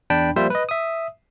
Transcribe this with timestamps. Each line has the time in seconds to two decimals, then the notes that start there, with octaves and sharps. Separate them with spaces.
0.10 E2 D4 G5 A5 B5
0.36 F3 G3 A#3 C5 E5
0.50 B4 D#5
0.69 E5 D#6